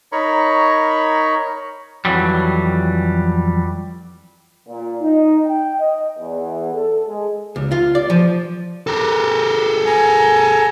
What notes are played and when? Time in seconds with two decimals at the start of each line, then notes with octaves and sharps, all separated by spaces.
0.12 D#4 A#4 C#5 B5 C#6
2.05 F2 E3 F#3 G3
4.69 A#2
5.01 D#4
5.46 G5
5.78 D#5
6.18 E2
6.73 A4
7.07 G#3
7.56 C#2
7.71 F4
7.95 D5
8.10 F3
8.87 G4 A4 A#4
9.86 G#5 A#5